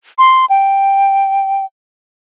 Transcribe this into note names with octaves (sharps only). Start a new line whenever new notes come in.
C6
G5